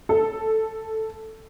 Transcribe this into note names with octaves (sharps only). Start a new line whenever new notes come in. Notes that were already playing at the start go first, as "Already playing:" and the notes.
A4